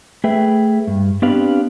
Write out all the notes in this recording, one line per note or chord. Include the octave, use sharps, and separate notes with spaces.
A3 G#4 B4 E5 G5
G2
B3 C4 D4 G4 B4 F5